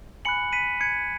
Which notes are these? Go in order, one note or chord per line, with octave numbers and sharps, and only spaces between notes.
G#5 B5 F#6 C#7 F#7
B6 D#7
G#6 C#7